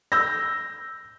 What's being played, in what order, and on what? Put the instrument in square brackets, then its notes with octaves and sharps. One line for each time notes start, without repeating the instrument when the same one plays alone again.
[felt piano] E6 G6 A#6